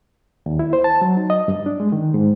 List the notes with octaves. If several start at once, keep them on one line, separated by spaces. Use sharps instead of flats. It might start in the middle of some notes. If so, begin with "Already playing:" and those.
D#2
E4
C5
A5
F#3
D#4
D#5
G2
D4
G#3
D#3
G#2